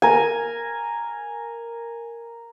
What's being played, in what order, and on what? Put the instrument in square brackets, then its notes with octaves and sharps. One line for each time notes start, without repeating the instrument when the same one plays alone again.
[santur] A#4 G#5